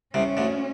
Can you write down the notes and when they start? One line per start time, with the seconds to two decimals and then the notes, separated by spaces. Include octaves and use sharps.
0.14 C2 C3 C#4
0.37 D2 D3